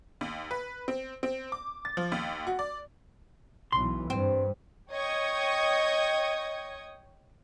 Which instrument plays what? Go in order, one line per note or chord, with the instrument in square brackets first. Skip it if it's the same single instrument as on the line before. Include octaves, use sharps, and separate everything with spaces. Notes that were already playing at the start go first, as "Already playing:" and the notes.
[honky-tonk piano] D#2
B4
C4
C4
D6
A6
F3
D#2
F#4
D5
[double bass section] B1 E3 [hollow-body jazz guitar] C6
[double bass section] G2 [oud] C4
[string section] C#5 D#5 G5 C#6 D#6 G#6